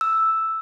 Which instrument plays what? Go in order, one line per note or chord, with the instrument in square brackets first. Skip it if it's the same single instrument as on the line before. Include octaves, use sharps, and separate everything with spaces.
[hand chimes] E6